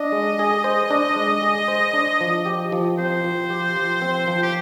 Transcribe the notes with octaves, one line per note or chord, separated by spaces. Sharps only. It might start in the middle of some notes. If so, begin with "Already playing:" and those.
Already playing: D4 D#5
G#3
G#4
C5
D4
G#3
G#4
C5
D4
F3
G4
F3
C4 C5
F3
G4
F3
C4
F3
G4